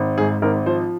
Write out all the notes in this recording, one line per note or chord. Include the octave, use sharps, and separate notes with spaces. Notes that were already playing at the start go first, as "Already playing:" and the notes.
Already playing: G#1
G#2 G#4
G#1 A#4
F3 C5